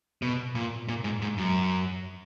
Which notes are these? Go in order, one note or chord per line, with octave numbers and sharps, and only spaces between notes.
B2
A#2
A#2
G#2
G#2
F#2